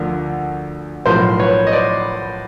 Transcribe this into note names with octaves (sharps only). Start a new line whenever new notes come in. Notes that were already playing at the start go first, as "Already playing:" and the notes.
Already playing: D2 D3 F3 A#4
B1 A2 F3 A#4 C5
B4 C#5
D#5
C5 D5